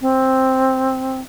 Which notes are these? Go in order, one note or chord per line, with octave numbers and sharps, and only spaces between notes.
C4